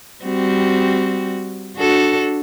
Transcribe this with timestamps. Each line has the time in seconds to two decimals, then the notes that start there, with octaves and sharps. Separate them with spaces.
0.25 G3 C4 F#4
1.76 D4 F#4 A4